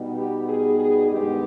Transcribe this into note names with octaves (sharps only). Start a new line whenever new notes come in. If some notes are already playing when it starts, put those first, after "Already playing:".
Already playing: B2 G3 B3 D#4
G4
G#4
G#4
G2 D#3 G#3 B3 D#4 G4